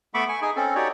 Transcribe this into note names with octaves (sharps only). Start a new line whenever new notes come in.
A3 B3 E5 B5 C#6 D6
G#5 C#6
D#4 G#4 G#5
C4 C#4 A4
D#4 F#4 G4 C#5 D5